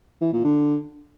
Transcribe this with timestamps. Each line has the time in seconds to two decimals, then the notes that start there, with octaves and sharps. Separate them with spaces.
0.21 E3
0.33 A#2
0.44 D3